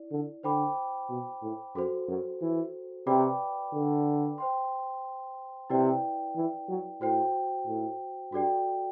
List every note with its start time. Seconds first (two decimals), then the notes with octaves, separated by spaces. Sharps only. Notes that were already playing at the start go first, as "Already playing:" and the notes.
Already playing: E4 D5
0.11 D3
0.43 D3 C5 G5 B5 D6
1.09 B2
1.42 A2
1.75 F#2 F#4 A4 C5
2.08 F#2
2.41 E3
3.07 C3 B4 D5 G5 B5 D6
3.73 D3
4.38 C5 G5 C6
5.70 C3 E4 B4 D5 G5
6.36 E3
6.68 F#3
7.01 A2 F#4 C5 G5
7.67 A2
8.33 G2 F#4 A4 D5 G5